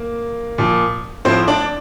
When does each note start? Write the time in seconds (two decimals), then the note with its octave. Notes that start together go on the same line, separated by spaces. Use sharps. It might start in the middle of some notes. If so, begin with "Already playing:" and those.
Already playing: A#3
0.58 A#2 F3
1.25 A2 F3 C4 C5
1.48 D4 D5